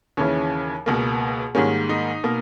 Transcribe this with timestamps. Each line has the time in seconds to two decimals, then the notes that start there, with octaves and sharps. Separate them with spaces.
0.17 D#2 C#3 E3 C#4
0.86 C#2 B2 A#3
1.55 G#2 D#3 G3 A#3 C#4
1.89 D#4
2.24 B2 A#3